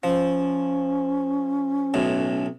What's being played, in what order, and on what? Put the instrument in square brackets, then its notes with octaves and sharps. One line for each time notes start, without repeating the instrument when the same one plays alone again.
[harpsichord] F3 [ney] C#4
[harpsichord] B1 A2